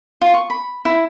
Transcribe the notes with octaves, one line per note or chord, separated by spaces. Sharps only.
F4
C#6
B5
E4